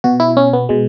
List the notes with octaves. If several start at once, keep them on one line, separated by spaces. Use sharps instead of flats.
B2 F#4
E4
C#4
B3
B2 G#3